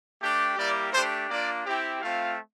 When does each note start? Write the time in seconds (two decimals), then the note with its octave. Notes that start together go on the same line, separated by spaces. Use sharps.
0.21 A3 D4 G4
0.57 G3 A#3 E4 G4 D5
0.93 A3 D4 G4 C5
1.30 A#3 D4 F4 D5
1.65 C4 E4 G4
2.02 A3 C4 F4 F5